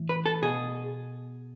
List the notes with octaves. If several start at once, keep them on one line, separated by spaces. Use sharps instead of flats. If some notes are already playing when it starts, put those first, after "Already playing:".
Already playing: A2 E3
B4
A4
B2 G#4